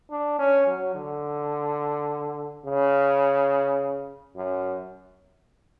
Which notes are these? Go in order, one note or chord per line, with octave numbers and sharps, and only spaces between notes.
D4
C#4
F#3
D3
C#3
F#2